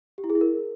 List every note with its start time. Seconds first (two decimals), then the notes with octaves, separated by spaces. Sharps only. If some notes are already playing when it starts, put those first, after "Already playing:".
0.18 G4
0.24 E4
0.30 G#4
0.35 E4
0.41 A#4